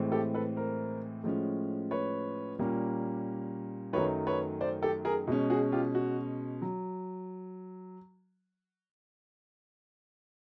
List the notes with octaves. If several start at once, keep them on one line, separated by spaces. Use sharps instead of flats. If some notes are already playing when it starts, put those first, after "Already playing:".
Already playing: A2 E3 G#3 C4
G4 A4
A4 B4
A#4 C5
A2 F3 G#3 C#4
B4 C#5
A#2 G3 A#3 C#4
F#2 D#3 F#3 A3 B4 C#5
B4 C#5
C5 D5
G4 A4
G#4 A#4
B2 G#3 C#4
F#4 G#4
F4 G4
F#4
F#3